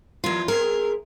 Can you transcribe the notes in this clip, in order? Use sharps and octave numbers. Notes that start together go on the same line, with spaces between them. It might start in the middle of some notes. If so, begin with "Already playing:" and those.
E2 F3 F4 A#4
B3 C4 G#4 A#4